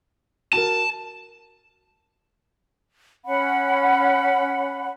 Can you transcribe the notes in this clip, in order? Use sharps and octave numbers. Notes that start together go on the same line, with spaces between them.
F#4 A#4 A5
C#4 F#5 B5